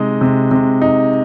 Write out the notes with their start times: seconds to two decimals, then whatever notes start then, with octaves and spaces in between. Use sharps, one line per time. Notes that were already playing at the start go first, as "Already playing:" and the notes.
Already playing: C3 G#3 D#4 D#5
0.21 C3
0.51 C3
0.82 D#4